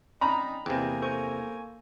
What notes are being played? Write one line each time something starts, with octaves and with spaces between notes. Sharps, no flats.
C4 C#4 D#4 D5 A#5 B5
E2 C3 A#3 G5 G#5
A4 C5 C#6